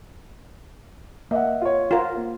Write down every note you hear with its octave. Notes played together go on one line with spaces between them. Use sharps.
A#3 D#5 E5 F#5
F4 C#5
F4 A#4 C5 F#5
A#3